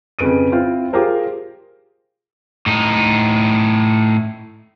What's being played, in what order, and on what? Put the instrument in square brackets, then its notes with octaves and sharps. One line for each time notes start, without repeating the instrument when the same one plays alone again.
[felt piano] F2 C#3 B4 D7 D#7
C4 E4 F4
F4 G4 G#4 A#4 C5
[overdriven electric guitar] A2 D#4